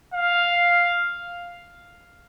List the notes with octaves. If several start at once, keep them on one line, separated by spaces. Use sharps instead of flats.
F5